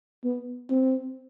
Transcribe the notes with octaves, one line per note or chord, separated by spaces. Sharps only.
B3
C4